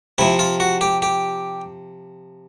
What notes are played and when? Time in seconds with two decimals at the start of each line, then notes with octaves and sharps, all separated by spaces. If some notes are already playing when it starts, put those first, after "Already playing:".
0.18 C3 F3 E4
0.39 F4
0.60 F#4
0.81 G4
1.02 G4